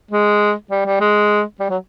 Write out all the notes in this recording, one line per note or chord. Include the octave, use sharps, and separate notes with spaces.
G#3
G3
G3
G#3
G3
F#3